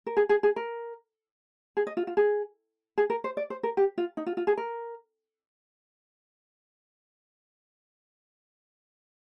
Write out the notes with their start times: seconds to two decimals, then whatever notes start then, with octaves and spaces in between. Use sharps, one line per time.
0.06 A#4
0.17 G#4
0.29 G#4
0.43 G#4
0.56 A#4
1.77 G#4
1.87 D#5
1.97 F4
2.07 F4
2.17 G#4
2.98 G#4
3.10 A#4
3.24 C5
3.37 D5
3.50 C5
3.63 A#4
3.77 G4
3.98 F4
4.17 D#4
4.26 F4
4.37 F4
4.47 G#4
4.57 A#4